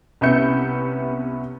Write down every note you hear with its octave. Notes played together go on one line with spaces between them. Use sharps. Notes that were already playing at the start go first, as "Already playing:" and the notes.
C2 B3 C#4 E5 G6 C#7